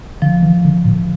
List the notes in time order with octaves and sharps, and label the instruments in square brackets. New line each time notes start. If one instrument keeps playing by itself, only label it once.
[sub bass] D3 [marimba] F3
[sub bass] E3
D3
A2